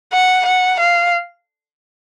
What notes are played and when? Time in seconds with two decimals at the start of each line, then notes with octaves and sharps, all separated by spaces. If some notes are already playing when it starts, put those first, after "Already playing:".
0.13 F#5
0.46 F#5
0.80 F5